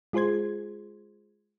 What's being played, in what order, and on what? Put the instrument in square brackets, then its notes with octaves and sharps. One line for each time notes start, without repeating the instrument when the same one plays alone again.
[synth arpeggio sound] G#3 F4 G#4 C5 C6 G#6